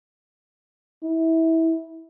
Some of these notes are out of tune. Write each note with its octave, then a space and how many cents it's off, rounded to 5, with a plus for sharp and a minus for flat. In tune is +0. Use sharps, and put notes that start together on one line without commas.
E4 -20